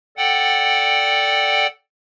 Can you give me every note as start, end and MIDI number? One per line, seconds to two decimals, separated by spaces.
0.17 1.67 69
0.17 1.67 74
0.17 1.67 78
0.17 1.67 79